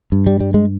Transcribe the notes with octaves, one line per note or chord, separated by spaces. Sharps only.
G2
G3
G3
G#3